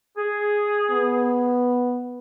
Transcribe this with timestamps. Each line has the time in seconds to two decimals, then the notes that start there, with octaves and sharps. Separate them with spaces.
0.17 G#4
0.90 B3